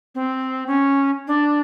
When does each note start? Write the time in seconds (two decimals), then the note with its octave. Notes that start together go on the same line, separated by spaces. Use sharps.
0.15 C4
0.67 C#4
1.28 D4